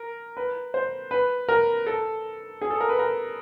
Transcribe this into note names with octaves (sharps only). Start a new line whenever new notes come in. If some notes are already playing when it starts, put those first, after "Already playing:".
Already playing: A#4
B4
C5
B4
A#4
A4
G#4
A4
A#4
B4
A#4